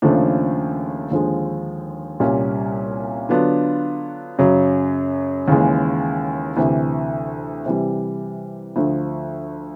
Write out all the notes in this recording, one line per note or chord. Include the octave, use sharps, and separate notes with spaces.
D#2 C#3 F3 A3 D4
D#2 D3 F3 G#3
C2 A#2 G3 A#3 C#4
D3 F#3 B3 D4 F4
F#2 C#3 F#3
D#2 C#3 E3 G#3
D2 C3 E3
C3 E3 G3
D2 D3 F3